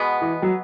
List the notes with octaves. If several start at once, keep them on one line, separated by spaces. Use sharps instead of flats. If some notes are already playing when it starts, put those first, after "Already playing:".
Already playing: B2 G#3 B3
E3
F#3